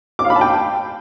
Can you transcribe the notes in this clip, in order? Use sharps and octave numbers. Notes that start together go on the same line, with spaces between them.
D6
F5
B5
A5
G5